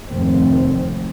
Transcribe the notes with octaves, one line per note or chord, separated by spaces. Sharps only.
F1 D#2 G#2 C4